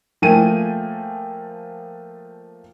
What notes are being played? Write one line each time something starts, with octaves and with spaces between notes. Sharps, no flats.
F3 A3 A#3 G5 G#5 D#7